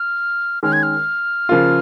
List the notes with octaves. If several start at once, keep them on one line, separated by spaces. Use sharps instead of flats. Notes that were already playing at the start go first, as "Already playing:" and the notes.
Already playing: F6
D#3 G#3 C#4 F6
G#6
F6
C#3 F3 A#3 F4